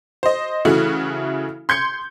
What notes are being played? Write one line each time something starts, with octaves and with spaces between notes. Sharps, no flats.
C5 D#5
C#3 E3 A3 F#4
C6 G6 G#6 C#7